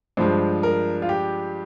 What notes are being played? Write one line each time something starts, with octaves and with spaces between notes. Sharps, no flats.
G2 F3 G#3 C5
A#4
F4
G4